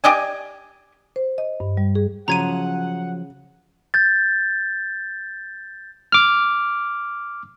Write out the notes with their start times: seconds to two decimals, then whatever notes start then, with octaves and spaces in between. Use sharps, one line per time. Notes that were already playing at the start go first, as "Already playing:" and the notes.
0.04 G4 D5 D#5 G#5
1.16 C5
1.38 D#5
1.60 G2
1.77 G3
1.95 G#4
2.28 C#3 F3 F#3 F#5 A#5 G#6 D#7
3.94 G6 A6
6.12 D6 F6